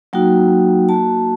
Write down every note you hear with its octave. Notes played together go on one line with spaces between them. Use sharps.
F#3 A#3 D#4 F#4 G5
A#3 F#4 A5